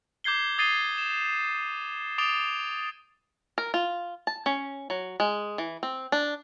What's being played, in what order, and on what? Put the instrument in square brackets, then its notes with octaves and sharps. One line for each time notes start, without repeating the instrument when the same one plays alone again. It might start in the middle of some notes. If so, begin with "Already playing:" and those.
[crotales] D6 G6 G#6 C7 G7
D#6 G#6 A6 C7 D#7 G7
E7
D6 D#6 A6 D7 F7 G7
[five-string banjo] A#4
F4
A5
C#4
F#3
G#3
E3
C4
D4